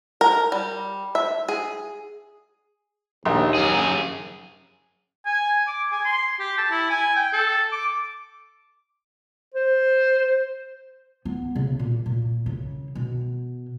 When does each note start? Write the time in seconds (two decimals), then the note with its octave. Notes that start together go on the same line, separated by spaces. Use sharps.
0.21 A#4
0.52 G3
1.15 E5
1.48 G#4
3.25 A#1 D#2
3.55 F#2 G#4
5.26 G#5
5.68 D6
5.92 G#5
6.05 C6
6.40 G4
6.58 A5
6.71 E4
6.90 G#5
7.16 G5
7.33 A4
7.72 D6
9.54 C5
11.25 B3
11.55 C#3
11.79 A#2
12.06 A#2
12.46 C#3
12.95 B2